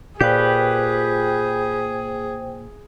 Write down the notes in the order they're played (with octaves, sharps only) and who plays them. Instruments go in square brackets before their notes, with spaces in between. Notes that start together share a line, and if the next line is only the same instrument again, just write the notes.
[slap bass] A#2 [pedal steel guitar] G4 B4 [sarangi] G#4 [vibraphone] C5 G5